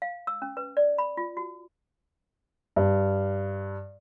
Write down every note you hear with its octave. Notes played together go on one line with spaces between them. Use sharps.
F5
E6
C#4
B4
D5
B5
F4
F#4
G2